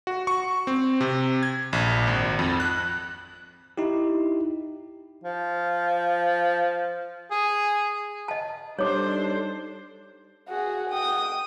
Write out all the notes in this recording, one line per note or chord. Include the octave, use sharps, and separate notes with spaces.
F#4
C#6
C4
C3
G#6
A#1
G#1
F2
F#6
D#4 E4 G4
F3
G#4
D#5 A5
G3 D4 D#4 G4 A4 C5 C#5 D6
F#4 G#4
G5 D#6